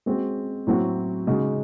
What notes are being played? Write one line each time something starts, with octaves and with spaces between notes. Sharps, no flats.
G#3 C4 F#4
A2 F#3 C4 F#4
C#3 G#3 D#4 F#4